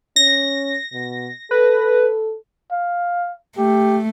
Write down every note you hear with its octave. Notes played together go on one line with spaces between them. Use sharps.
C#4 A#6
B2
A4 B4
F5
A3 G4